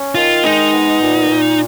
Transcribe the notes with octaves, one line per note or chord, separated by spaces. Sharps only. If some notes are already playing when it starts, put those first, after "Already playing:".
Already playing: C#4
D#3 F4
G#3 D#4
B3
A#2
A#2